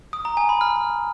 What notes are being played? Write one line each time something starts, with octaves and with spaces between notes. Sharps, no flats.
D#6
A#5
G#5
B5
F6